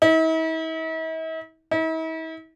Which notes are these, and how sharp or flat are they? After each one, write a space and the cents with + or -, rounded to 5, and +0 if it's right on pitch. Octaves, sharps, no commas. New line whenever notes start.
E4 -45
E4 -45